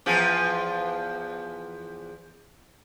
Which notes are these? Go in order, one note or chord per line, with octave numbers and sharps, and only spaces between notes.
E2 F3 G#4